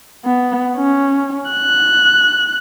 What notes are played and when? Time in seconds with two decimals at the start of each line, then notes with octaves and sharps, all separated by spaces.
0.25 B3
0.77 C#4
1.51 F#6